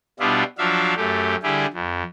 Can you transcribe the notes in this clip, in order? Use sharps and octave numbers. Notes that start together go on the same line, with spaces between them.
B2 G3 B3 D4 E4 F4
F3 F#3 D4 E5 F5
F#2 A3 G4
D3 G3 E4 G4 G#4
F2